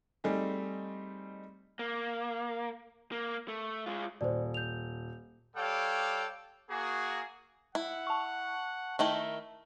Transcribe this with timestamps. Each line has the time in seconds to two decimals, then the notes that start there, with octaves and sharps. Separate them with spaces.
0.24 G3 A3 C4 D#4 G#4
1.79 A#3
3.12 A#3
3.48 A3
3.86 G#3 F4
4.21 D#1 C5 D5
4.54 G6 F7
5.56 G3 A4 C#5 F5 G5 D6
6.70 A#3 F#4 G#4
7.75 E4 F#5
8.07 A5 C#6
8.99 D#3 A3 E4 A#4